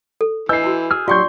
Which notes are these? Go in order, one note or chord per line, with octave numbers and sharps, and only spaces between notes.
A4
E3 B4 D#5 G#5 E6 G6 C7
E4 F#4
G#4 E6 F6
F#3 F4 G4 D5 G5 C6 C#6 G6